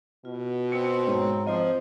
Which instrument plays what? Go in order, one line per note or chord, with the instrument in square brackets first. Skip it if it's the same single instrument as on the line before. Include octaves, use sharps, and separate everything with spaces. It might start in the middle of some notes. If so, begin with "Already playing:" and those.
[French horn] B2 [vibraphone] F4
[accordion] C4 [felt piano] C#7
[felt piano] G#2 [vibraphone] C#5 A#5
[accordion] F3 [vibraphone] C4 F4 C5 [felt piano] D#5